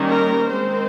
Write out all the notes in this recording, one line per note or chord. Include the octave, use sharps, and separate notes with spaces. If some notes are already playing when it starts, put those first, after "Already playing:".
Already playing: D#3 G3 A#3 C#4
A#4
D#3 G#3 C4 C5